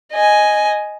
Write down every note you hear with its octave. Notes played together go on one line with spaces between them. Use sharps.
D#5 G#5